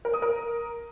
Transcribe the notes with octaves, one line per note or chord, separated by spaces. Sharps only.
A#4
D#6
A#4